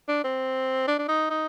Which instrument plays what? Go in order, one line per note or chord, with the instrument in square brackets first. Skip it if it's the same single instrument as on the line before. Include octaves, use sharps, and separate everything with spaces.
[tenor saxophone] D4
C4
D4
D4
D#4
D#4